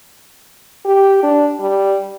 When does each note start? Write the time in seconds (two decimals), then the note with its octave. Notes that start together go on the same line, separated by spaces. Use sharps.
0.85 G4
1.23 D4
1.60 G3